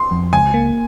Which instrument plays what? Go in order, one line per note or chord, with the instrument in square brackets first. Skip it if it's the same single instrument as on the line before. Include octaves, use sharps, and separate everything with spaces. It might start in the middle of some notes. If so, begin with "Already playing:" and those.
Already playing: [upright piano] C6
[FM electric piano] F2
[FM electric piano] C#2 [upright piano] G#5
[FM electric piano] A#3